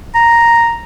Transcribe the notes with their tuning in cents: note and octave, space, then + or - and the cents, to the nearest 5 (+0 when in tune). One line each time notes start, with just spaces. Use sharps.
A#5 +0